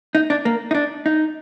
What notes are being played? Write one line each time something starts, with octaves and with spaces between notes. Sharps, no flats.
D#4
D4
A#3
D#4
D4
D#4